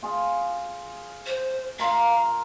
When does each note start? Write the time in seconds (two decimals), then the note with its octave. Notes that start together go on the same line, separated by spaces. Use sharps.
0.02 F4 G#4
1.26 C5
1.79 F4 A#4 F5